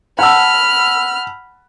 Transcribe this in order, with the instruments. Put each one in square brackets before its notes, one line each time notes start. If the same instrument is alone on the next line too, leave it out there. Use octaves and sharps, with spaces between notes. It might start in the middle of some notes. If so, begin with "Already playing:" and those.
[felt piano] F#5 A5 E6 [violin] B5 F6